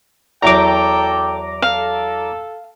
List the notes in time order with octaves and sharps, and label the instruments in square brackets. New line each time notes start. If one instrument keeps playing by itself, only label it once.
[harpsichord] E2 F#3 [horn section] A4 G5 [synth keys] A#5 D6
[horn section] A4 [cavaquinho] F5